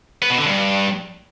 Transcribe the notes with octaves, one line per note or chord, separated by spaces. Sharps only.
B3
B2
D3
G2